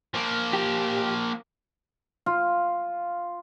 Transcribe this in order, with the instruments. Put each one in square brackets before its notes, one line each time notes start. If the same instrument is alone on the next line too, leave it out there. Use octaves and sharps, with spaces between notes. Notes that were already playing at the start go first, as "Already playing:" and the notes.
[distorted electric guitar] F3 A#3
[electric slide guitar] G4
[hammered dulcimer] F4